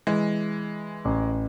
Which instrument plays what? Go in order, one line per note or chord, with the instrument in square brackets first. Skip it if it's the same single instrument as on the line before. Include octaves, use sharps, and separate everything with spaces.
[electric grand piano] E3 [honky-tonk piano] G#3
[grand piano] A1